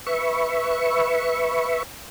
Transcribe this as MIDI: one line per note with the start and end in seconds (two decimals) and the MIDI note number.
0.07 1.83 71
0.07 1.83 76
0.07 1.83 85